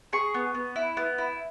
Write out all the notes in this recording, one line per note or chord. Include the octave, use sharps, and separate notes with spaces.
G#4 C#6
B3
B3
E4
B3
E4